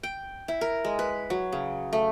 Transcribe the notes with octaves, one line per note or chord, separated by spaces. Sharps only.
G5
E4
A#4
G#3
B4
F#3
C#3
A3